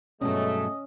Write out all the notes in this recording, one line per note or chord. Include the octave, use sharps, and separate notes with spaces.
G2 B2 F#3 G#3 A3 C#4 D#5